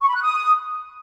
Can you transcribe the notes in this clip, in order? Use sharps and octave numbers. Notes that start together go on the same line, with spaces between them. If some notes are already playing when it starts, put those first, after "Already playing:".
C#6
B5
F#6
D#6